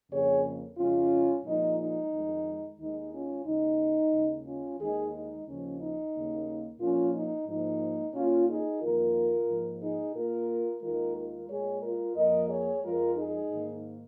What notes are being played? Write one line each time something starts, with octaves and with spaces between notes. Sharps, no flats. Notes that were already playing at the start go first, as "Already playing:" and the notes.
F2 C#3 A#3 G#4 C#5
F2 C#3 G#3 C#4 F4
A#2 F3 G#3 D#4
D#4
F2 D#3 G#3
D#2 D#3 G#3 D#4
C#4 F4
D#2 C#3 G#3 D#4
D#2 C#3 G#3
C#4 F4
D#2 D#3 G#3 D#4 G#4
D#4
D#2 C#3 F3 C#4
D#4
D#2 C#3 A#3
A#2 F3 A#3 C#4 F4
D#4
G#2 F3 A#3 D#4
A#2 A#3 C#4 F4
D#4 G#4
F2 D#3 A#3 F4 A#4
G#2 F3 A#3
D#4 G#4
A#2 A#3 F4 A#4
D#2 D#3 G#3 F4 A#4
F4 A#4
A#2 G#3 G#4 C#5
F4 A#4
F2 F3 A#3 A#4 D#5
G#4 C#5
F2 F3 G#3 F4 A#4
D#4 G#4
G#2 D#3 A#3